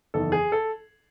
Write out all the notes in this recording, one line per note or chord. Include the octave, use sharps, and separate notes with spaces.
F#1 E2 D#3 A4
G#4
A4